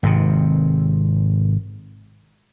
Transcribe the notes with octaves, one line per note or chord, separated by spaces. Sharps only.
G#1 G#2 C3